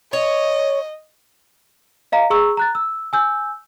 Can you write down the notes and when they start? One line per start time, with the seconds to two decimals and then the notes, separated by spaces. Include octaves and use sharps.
0.13 C#5 D#5
2.12 D#5 F5 A#5
2.30 G#4 A#5 C#6 E6
2.57 A#5 F#6 A6
2.75 E6
3.13 G#5 E6 G6